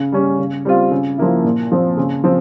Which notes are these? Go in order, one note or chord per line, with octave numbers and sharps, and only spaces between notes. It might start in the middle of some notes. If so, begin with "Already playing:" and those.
Already playing: C#3
G3 C#4
C#3
G3 C4 F4
C#3
F3 A#3 E4
A#2
F3 C4
C#3
F3 C4